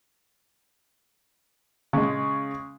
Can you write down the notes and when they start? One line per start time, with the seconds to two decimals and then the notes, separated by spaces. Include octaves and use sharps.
1.93 C#3 G#3